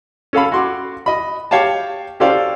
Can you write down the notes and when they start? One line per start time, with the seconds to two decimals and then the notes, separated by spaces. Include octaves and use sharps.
0.33 C#4 A4 F5 B5
0.52 F#4 C6 D6
1.06 D#5 B5
1.51 G4 C#5 F5 G5 A5
2.20 C#4 G4 A4 C5 D5 F5